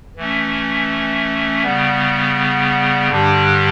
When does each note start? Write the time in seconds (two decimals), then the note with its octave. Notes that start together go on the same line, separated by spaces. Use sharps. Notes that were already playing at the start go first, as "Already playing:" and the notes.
0.17 E3 A3 C#4
1.63 C#3 G3 B3
3.09 G2 D3 G3 D4 G4